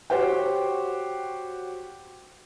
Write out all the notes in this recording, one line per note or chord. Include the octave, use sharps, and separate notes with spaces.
F#4 G4 C5 C#5 F#5 G5